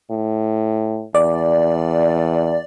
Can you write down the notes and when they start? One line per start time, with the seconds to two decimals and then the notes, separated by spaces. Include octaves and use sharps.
0.11 A2
1.15 E2 D5